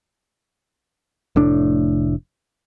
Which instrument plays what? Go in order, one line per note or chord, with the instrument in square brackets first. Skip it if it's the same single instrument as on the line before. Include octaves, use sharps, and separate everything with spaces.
[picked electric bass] F1 A2 D4